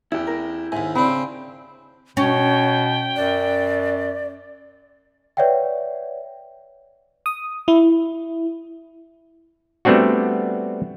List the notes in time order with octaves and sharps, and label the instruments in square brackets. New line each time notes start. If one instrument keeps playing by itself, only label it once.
[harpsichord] E2 [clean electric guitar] E4 G4
[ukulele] A#4
[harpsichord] D#2 G#2 [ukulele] E5 G#5
[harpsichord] C#3 D4 [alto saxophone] C4 [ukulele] B5
[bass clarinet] B2 [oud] C#4 [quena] C#5 [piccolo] G5
[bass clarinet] F#2 [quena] D5
[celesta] B4 C#5 D5 E5 F#5 G5
[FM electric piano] D#6
E4
[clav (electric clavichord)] G3 A3 B3 C4 D4 F#4